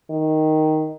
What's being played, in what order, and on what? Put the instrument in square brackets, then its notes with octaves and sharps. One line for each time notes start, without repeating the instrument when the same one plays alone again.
[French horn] D#3